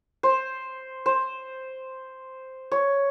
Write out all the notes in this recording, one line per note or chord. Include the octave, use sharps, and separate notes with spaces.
C5
C5
C#5